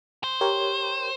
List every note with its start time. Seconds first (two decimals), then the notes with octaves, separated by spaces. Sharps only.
0.24 C5
0.41 G4 A#4 C#5